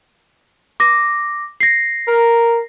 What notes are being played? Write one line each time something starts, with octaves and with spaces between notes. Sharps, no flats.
D6 A#6
A#6 C7
A#4